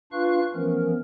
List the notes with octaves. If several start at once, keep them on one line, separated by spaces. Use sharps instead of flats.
D4 F4 B4 F5 C#6 F#6
E3 F3 A3 B3 C#4 A#4